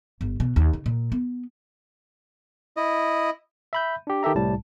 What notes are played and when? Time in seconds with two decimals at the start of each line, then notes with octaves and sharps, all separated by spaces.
0.21 G1
0.40 B2
0.56 D#2
0.73 C#3
0.86 A#2
1.12 B3
2.77 E4 D#5
3.73 E5 B5 G6
4.07 D4 G4
4.23 D#3 G4 A4 E5 A#5
4.35 C2 A2 G3 A5